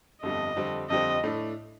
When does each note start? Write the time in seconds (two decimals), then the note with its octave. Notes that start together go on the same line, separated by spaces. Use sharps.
0.22 G1 F2 D3 G3 D4 D#5
0.56 F2 D3 G3 C4
0.89 F2 D3 G3 C4 D#5
1.23 A2 A3 D4